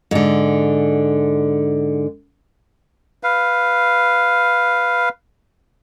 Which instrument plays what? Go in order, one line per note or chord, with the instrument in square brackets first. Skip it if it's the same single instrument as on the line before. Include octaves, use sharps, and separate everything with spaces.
[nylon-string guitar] G#2 D3
[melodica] B4 F5